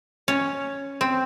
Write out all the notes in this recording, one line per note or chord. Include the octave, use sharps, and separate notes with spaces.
C#4
C4